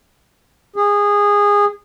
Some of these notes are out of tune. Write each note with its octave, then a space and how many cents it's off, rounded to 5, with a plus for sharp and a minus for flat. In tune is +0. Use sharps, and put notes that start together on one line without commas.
G#4 -20